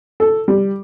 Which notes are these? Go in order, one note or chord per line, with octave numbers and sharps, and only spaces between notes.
A4
G3